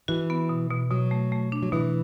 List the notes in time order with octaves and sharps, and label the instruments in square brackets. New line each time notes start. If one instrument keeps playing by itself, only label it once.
[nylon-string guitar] E3 [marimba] F#4
[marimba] B3
B2
B2
[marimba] B2 [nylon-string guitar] F#3
[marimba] A3
A3
D4
[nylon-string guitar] F#3
[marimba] B2 [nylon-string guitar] E3